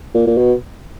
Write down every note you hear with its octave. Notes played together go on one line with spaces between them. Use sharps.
A#2
A#2
B2